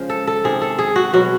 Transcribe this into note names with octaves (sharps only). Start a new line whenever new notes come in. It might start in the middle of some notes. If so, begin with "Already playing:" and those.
Already playing: C#3 F3 G#3
A4
A4
C3 D#3 G#3 G#4
A4
G#4
F#4
B2 F#3 F#4